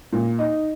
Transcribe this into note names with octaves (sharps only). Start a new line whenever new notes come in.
A#2
D#4